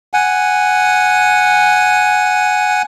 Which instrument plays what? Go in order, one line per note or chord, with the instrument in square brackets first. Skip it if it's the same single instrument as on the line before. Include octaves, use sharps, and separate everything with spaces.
[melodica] F#5 G#5